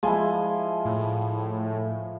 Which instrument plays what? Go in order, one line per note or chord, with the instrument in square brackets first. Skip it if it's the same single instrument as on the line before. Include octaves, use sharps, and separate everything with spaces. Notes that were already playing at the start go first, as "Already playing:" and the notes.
[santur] F3 E4 [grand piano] G#3 G#5
[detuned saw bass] A2